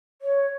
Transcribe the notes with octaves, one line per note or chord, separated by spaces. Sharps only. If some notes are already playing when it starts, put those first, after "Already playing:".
C#5